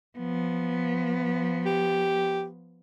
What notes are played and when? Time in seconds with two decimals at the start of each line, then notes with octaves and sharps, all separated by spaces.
0.18 F3 B3
1.66 G4